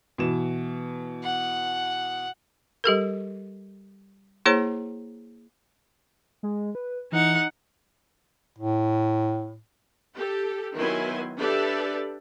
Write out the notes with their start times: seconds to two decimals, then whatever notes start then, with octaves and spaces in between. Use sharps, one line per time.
0.18 B2 E3 E7
1.24 F#5
2.84 G3 G4 A4 A#4
4.45 A#3 E4 G#4 C5 C#5 A#5
6.43 G#3
6.75 B4
7.12 E3 D#4 F#5
8.58 A2
10.15 G4 A4
10.76 D#3 F#3 B3 E4 G#5 C6
11.37 D4 G4 A4 B4 D5 E5